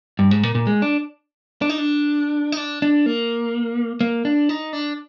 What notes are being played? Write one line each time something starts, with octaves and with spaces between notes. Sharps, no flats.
G2
G#2
A#2
A#2
G#3
D4
D4
D#4
D4
D#4
D4
D4
A#3
A#3
D4
D#4
D4